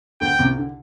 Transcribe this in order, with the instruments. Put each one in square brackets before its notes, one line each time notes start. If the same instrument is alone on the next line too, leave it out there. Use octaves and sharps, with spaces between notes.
[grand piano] D2 D3 [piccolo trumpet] G5
[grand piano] C2 C3
D3